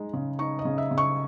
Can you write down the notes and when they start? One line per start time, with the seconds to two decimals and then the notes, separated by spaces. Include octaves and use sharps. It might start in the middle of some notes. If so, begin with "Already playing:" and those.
Already playing: G#3 D#4
0.14 C#3
0.39 D#4 C#6
0.59 D#5
0.65 C#3
0.78 E5
0.91 C#3
0.98 C#6